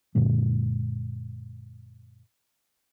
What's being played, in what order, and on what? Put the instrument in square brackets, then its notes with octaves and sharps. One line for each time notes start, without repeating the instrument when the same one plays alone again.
[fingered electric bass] F#2 A#2 D3 G#3